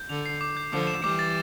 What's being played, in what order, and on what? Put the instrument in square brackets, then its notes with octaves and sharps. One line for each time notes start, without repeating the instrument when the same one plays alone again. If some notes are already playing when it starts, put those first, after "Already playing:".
Already playing: [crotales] G6
[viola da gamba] D3 [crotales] F7
[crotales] C7
D6
G6
[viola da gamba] D3 F3 [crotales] D6
[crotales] E7
[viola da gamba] E3 G3 [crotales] D6
[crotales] A6